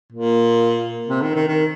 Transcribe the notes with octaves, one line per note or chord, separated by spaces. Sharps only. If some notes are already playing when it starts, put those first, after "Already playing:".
A#2
C3
D#3
D#3
D#3